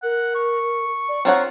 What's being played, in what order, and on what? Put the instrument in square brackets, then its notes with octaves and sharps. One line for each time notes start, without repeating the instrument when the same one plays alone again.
[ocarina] A#4 [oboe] F#5
[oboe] C#6
[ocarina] D5
[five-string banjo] C4 C#5 F#5 [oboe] F4 [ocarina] A#5